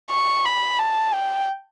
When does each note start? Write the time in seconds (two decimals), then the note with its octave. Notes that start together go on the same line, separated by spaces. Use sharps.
0.11 C#6
0.45 B5
0.79 A5
1.13 G5